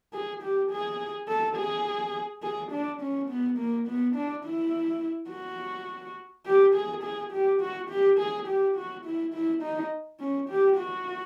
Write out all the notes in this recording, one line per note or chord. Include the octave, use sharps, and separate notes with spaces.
G#4
G4
G#4
A4
G#4
G#4
D4
C#4
B3
A#3
B3
D4
E4
F#4
G4
G#4
G#4
G4
F#4
G4
G#4
G4
F#4
E4
E4
D#4
C#4
G4
F#4